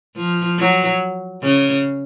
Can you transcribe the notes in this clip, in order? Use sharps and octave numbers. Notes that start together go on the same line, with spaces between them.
F3
F#3
C#3